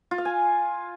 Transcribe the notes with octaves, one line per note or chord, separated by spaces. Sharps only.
F4
F5
G#5